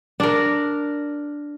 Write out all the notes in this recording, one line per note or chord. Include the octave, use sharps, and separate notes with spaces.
D4 A#4